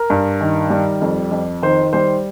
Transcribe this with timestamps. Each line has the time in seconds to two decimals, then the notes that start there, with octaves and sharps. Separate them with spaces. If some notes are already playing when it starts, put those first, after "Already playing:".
Already playing: A#4
0.10 G2
0.41 D#3
0.70 G3
1.01 F2
1.31 F2
1.62 D#3 C5
1.93 G3 C5